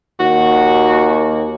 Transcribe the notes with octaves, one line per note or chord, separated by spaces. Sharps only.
D#2 F#4